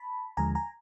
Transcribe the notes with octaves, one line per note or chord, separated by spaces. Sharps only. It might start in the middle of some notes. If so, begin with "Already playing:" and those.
Already playing: A5 B5
D#2 D3 F3 G#3 G#5 A#5
G#5 A#5